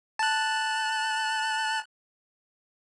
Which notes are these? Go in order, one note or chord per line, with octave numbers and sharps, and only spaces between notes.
A5 F#6